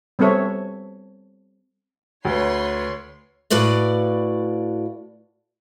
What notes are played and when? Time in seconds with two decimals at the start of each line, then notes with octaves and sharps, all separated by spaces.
0.19 G3 B3 C4 A4 C#5 E5
2.25 D2 B4 C#5 C6
3.50 A2 F#4 B4 D5 F5